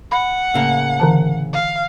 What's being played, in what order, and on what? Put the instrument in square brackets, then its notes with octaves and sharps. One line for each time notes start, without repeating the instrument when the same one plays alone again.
[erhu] F#5 [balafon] B5
[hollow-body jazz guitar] A2 C#3 A#3
[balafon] D3 E3 A5
[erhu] F5